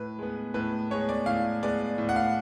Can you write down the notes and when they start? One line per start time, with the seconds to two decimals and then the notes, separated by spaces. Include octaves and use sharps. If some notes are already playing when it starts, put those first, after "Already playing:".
Already playing: A2 B4
0.19 G#3 B3
0.54 A2 B4
0.91 G#3 B3 C#5
1.09 D5
1.26 A2 F5
1.63 G#3 B3 D5
1.98 A2
2.09 F#5
2.16 F5